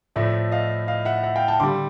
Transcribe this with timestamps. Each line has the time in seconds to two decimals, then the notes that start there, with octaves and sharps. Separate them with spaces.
0.16 A2 F3 A3 D5 E5
0.51 D#5 F5
0.88 D#5 F5
1.05 E5 F#5
1.23 E5 F#5
1.36 F5 G5
1.48 G5 A5
1.60 D3 G3 C6 D6